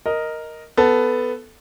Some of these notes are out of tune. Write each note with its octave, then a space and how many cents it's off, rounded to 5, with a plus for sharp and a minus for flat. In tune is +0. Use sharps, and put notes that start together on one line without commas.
A#4 +0 D#5 +0
B3 +10 A4 +0